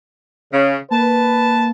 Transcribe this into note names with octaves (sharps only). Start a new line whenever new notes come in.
C#3
A#3 B4 A5